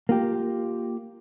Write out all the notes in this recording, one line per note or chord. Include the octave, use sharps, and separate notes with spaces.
A#3 F4 G4